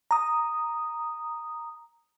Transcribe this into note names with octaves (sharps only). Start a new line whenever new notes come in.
A#5 D#6